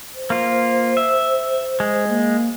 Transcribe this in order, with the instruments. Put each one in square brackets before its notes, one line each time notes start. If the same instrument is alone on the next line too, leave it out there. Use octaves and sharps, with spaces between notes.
[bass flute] C5
[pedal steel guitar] A#3 F4
E5
G#3
[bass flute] A#3